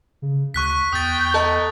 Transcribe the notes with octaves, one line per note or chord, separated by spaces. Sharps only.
C#3
D2 C#6 F#6 B6
E2 G5 D#6 A6
A4 D#5 A#5